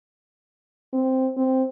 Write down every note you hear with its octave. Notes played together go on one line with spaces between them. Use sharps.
C4
C4